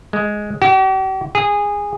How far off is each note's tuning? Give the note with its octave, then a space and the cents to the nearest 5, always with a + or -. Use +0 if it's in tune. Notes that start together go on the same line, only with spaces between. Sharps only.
G#3 +5
G4 -45
G#4 -20